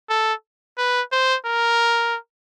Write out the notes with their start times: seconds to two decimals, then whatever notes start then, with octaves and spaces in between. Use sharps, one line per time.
0.10 A4
0.78 B4
1.12 C5
1.45 A#4